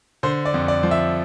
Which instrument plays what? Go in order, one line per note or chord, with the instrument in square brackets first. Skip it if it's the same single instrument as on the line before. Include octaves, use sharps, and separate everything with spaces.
[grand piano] D3 C5
D5
F2
D5
F3
E5